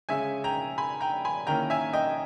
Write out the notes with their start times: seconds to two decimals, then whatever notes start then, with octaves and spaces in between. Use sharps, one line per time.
0.09 C#3 G#3 C#4 E5 G#5
0.44 G5 A#5
0.78 G#5 B5
1.01 G5 A#5
1.25 G#5 B5
1.47 D#3 A#3 C#4 E4 G5 A#5
1.70 E5 G#5
1.93 D#5 G5